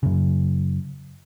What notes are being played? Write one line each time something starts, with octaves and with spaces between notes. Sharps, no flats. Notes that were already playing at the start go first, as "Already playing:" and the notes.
F#2 C#3